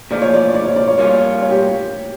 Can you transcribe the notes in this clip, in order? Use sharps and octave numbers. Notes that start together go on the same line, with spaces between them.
A#2 F3 G#3 D5
C#5
D5
D5
C#5
D5
C#5
G3 A#3 C#4 F4 C#5
C#5
G4